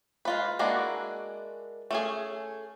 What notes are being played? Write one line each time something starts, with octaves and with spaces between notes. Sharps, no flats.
G#3 F4 B4
G#3 A#3 D4 E4 F#4
A3 C#4 G#4